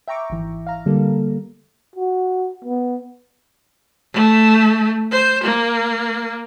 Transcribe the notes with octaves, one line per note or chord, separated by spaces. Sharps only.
E5 G5 A#5 C#6 D6
G#1 E3
F5 A#5
D3 G3 A#3 A4
F#4
B3
A3
C5
A#3